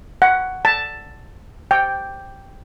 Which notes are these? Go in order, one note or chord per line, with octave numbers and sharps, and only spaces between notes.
F#5
A5
G5